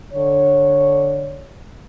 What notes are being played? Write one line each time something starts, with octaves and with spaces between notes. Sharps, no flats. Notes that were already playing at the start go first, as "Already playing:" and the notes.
D3 C#5